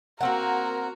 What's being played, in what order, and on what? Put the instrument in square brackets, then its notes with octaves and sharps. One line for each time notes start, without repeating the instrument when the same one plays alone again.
[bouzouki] A#3 C4 F#5 [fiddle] F#4 A#5 [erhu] A#4